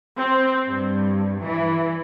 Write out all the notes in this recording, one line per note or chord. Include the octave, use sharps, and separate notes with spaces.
C4
G2
E3